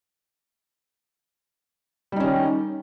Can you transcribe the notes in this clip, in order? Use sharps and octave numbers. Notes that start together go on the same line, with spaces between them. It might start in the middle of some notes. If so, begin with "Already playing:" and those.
D#3 G3 C#4 D#4